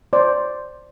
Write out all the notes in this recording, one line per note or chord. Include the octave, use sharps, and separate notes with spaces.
C5 D5